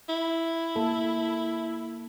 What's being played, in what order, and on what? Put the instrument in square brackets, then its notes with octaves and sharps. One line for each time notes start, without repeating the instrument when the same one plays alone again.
[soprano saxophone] E4
[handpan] A#3 A4